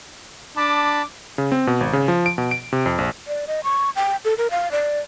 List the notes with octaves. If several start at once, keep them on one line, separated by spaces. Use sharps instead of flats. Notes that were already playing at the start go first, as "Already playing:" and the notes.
D4 A5 B5 D6
C#3
C4
B2
G#1
C#3
F3
D7
B2
D7
C3
F2
A#1
D5
D#5
C#6
G5
A4
A#4
F5
D5